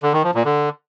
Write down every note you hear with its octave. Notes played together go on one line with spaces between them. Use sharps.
D3
D#3
F3
A#2
D3